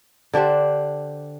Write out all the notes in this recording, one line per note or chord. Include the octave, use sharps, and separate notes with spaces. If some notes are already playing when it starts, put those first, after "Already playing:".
D3 D4 G4 C5